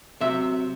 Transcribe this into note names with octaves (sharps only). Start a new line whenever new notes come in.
C3 F#3 E5